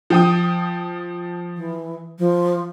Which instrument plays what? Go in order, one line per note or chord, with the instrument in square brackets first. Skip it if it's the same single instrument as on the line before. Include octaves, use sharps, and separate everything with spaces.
[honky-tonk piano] F3 G5 D#6
[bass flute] E3
F3